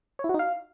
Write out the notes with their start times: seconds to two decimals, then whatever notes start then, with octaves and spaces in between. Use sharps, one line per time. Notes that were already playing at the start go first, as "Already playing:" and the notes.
0.19 C#5
0.24 E4
0.29 F#4
0.34 D#4
0.39 F5